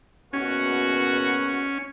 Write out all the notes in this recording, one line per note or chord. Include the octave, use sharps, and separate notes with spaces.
F#1 B2 C#4 F#4